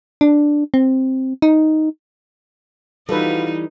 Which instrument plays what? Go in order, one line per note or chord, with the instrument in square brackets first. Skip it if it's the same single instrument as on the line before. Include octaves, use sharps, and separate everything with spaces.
[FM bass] D4
C4
D#4
[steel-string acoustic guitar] E3 G3 [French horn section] F3 F4 F#4 [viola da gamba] D#4 [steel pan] A4 B4